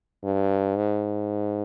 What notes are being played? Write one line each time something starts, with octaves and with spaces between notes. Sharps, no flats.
G2
G#2